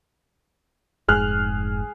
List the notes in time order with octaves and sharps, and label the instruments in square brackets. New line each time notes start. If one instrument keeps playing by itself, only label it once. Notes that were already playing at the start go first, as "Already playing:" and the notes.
[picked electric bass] F1 G#2 [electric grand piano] G#4 F6 F#6